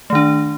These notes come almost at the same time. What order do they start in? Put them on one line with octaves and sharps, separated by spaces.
A3 D#3 D4